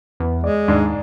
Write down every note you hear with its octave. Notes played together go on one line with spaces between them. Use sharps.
E2 B3
G#3 D5
D#2 G#2 D4